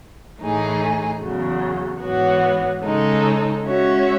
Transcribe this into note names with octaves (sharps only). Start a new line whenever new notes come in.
A2 E3 A3 D#4 G#4
E2 C#3 F#3
G#2 E3 B3 F#4 C#5
C#3 G#3 D#4 A4
G#3 C#4 F#4 C#5 E5